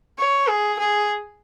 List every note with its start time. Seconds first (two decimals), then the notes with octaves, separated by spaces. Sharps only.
0.18 C#5
0.48 G#4
0.79 G#4